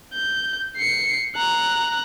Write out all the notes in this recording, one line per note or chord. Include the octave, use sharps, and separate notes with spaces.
G6
C7 C#7
A#5 F#6